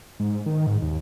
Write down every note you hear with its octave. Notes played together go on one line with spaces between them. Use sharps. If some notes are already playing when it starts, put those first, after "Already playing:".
G#2
D#3
G#2
D#2